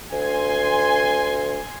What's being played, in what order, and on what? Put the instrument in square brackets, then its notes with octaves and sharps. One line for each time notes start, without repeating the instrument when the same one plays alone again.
[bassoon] D2 [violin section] G#5 C6